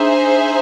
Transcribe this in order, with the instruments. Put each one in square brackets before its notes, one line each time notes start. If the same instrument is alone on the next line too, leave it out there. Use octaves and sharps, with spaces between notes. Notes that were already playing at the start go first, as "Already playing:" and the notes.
Already playing: [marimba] D4 [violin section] D#4 G#4 C5 E5